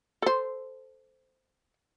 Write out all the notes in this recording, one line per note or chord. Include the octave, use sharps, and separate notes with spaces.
A4 C5